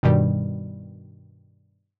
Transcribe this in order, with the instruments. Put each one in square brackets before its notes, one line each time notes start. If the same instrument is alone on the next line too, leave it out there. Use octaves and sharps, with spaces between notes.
[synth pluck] G2 B2 D#3 G3